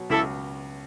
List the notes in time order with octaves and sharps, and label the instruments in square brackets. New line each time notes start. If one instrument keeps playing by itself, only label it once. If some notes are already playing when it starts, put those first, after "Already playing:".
Already playing: [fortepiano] B2 F#3
[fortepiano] C#2 [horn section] E4 A4